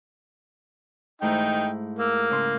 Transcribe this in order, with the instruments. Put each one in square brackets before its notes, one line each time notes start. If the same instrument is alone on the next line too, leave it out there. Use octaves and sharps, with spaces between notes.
[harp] G#2 A3 E4 [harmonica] D#4 G5
[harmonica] A#3 [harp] E6
[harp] C#3 C6